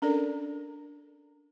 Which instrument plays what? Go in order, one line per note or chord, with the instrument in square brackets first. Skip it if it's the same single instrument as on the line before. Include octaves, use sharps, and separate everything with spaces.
[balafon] C#4 D4 A4 A#4 D5